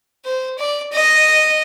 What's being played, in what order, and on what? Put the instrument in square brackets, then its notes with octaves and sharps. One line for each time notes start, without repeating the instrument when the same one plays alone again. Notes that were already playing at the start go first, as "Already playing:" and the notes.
[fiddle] C5
D5
D#5